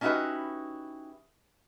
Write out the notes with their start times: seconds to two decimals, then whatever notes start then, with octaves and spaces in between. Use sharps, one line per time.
0.01 C#4 D#4 E4 F#4 G4 B4